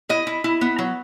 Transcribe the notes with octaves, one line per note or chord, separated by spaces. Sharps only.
E4 D#5
E4
E4
B3
F#3